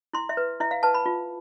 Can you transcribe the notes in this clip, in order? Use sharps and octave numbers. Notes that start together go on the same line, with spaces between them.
E4 C6
E5
B4
E4 E5
F5
B4 A5
B5
F4